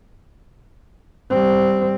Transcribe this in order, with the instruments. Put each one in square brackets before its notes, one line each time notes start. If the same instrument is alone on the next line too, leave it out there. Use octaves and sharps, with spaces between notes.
[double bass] G3 C4